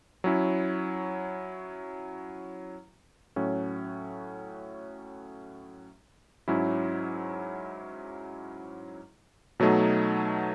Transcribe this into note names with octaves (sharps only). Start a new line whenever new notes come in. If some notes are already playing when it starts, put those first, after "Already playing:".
F#3 C#4 E4
A2 F#3 C#4
G#2 F#3 C#4 E4
B2 F#3 A3 D#4